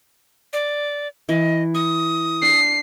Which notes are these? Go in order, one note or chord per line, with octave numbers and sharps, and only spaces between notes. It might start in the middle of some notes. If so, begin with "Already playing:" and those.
D5
E3 D#5
C#6 D#6
D4 C7